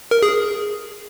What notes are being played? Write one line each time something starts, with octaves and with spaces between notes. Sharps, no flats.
A#4
G#4